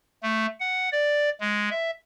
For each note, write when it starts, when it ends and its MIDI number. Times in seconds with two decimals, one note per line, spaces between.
0.23 0.46 57
0.60 0.89 78
0.92 1.30 74
1.40 1.69 56
1.71 1.91 76